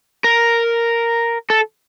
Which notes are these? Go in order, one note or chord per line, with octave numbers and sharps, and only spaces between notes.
A#4
A4